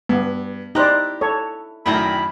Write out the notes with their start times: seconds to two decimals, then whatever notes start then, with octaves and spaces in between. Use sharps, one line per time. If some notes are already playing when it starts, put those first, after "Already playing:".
0.09 G2 B3
0.75 D#4 E4 G4 C5 D5 A#5 F#6
1.21 A4 C#5
1.86 F#2 A2 D#3 D4 G5 A#5 B5